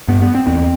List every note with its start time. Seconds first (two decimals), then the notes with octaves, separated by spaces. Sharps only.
0.08 G2 B3
0.22 B3
0.35 C4
0.47 E2 C4